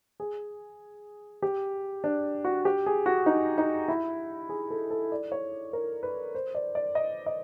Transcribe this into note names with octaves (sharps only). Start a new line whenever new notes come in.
G#4
G4
D4
F#4
G4
G#4
F#4
D#4
D#4
E4
G#4
A4
A4
D5
C#5
A#4
B4
C5
D5
D5
D#5
D#5